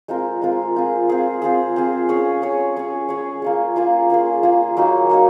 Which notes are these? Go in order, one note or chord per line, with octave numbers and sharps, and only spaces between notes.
G#3 C4 F4 A#4
G#3 C4 F4 A#4
C4 F4 G#4
C4 F4 G#4
C4 F4 G#4
C4 F4 G#4
C#4 G#4 C#5
C#4 G#4 C#5
C#4 G#4 C#5
C#4 G#4 C#5
A#3 F4 G#4
A#3 F4 G#4
A#3 F4 G#4
A#3 F4 G#4
F#3 A#3 D#4
F#3 A#3 D#4